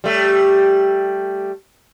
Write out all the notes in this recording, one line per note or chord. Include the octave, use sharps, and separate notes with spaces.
G3 A3